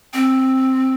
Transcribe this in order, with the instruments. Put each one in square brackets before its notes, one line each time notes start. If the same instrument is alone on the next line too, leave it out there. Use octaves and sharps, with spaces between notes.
[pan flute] C4